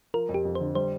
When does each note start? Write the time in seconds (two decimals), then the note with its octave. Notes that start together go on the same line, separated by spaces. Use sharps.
0.14 F3 A#4
0.29 F2
0.34 G4
0.45 F2
0.55 C5
0.61 D3
0.75 G3 C5